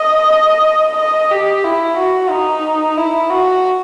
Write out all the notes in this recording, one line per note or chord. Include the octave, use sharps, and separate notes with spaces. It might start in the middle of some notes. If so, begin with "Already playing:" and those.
Already playing: D#5
D#5
G4
E4
F#4
D#4
E4
F#4